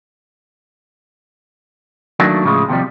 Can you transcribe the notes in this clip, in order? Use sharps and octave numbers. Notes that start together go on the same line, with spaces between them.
D#3 F#3 A3 A#3 D4
A2 C#3 F3 G#3 F4
D#2 C3 D#3 F3 G3